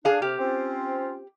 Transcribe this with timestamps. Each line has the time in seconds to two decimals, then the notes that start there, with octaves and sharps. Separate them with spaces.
0.05 D4 G#4 F5
0.22 C3 G4 F6
0.39 C4 C#4 F4